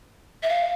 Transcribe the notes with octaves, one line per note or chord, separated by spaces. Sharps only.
E5
F5